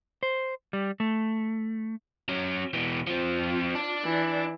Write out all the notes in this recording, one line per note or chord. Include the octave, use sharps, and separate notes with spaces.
C5
G3
A3
F#3 C#4
B2 E3
F3 C4 F4
D4
E3